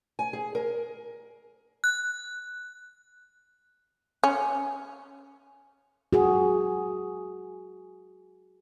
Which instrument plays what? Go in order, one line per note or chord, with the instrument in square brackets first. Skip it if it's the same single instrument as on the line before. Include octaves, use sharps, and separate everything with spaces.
[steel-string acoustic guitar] G#5
G#4
A#4
[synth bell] F#6
[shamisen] C#4
[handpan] F#4 G#4